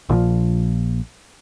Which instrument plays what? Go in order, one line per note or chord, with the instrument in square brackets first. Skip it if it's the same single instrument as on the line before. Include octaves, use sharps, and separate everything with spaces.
[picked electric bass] A#1 A#2 D3 F3